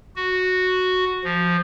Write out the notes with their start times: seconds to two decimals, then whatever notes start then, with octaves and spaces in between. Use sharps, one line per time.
0.16 F#4
1.24 F3